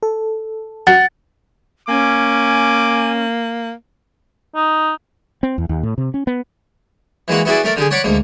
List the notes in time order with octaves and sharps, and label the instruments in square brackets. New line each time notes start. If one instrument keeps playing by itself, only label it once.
[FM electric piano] A4
[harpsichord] F#3 [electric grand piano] F#5 [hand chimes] A6
[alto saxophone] A#3 [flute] C#4 [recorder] G#5 [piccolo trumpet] D6
[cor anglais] D#4
[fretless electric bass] C4
E2
D#2
A2
C3
C#4
B3
[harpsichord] E3 G#3 A#3 F#4
B3 E4 F#4 G#4 D5
A3 A#4 D5
D3 G4 G#4
C#5 D5 F#5 B5 C#6 D6
D2 G#2 A#3